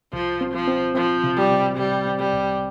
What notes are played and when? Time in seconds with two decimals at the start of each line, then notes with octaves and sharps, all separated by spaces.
0.13 C2 F3
0.41 C4
0.54 F3
0.68 C4
0.95 F3 C4
1.24 C3
1.37 G3
1.51 C3
1.78 C3 G3
2.06 C4
2.19 G3
2.33 C2